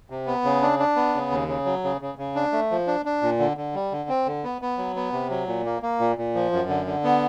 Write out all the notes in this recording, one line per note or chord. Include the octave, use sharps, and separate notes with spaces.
C3
B3
C#3
D4
D4
B3
C#3
D#2
C#3
F#3
C#3
C#3
C#3
D4
A3
F3
D4
D4
A#2
D3
D3
G3
D3
C4
D3
B3
B3
F#3
B3
C3
F#3
A#2
A#3
A#3
A#2
A#2
F3
F#2
D3
D3
B3